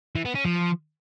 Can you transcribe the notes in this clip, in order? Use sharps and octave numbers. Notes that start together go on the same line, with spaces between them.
E3
B3
C#4
F3